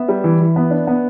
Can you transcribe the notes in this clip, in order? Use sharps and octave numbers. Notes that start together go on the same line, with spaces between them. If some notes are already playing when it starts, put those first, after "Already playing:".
Already playing: B3 E5
G3
E3
E3
B3
D4
B3